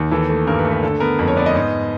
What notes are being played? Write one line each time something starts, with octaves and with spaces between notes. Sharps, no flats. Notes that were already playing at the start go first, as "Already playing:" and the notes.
Already playing: D#2
E3 A4
A3
G2 A#4
B4
A3
B4
D3 A4
B3 A#4
F2 B4
C#5
B3 D5
D#5
G#2